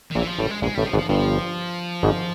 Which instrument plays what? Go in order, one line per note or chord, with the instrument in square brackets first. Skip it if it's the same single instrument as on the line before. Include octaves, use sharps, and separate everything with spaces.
[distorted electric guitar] D#3
[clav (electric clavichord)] A#1 A#2 [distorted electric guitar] E3
[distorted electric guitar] F3
[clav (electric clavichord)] A1 A2 [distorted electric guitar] G3
[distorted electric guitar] G#3
[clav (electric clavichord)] A#1 A#2 [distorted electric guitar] G#3
[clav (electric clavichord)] A1 A2 [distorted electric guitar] G3
[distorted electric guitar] F3
[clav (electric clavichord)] G#1 G#2
[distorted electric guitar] F3
[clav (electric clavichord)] G1 G2 [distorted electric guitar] F3
[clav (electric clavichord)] G#1 G#2